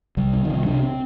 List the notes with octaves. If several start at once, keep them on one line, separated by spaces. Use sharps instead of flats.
C2 G3
C3
D#3
C2 F3
C3 D4
C4